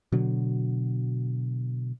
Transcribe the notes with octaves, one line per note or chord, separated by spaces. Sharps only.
B2 D3 F#3